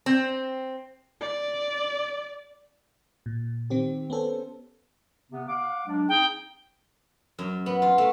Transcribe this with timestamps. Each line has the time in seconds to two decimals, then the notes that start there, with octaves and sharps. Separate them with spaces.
0.06 C4
1.21 D5
3.26 A#2
3.70 D#3 C4 G4
4.10 B3 C#4 A4 C5
5.31 C3 B3
5.48 F5 F#5 D6
5.87 F#3 G#3 D4
6.09 C4 D#4 G#4 G5
7.39 F#2
7.66 B3
7.82 F4
7.98 A3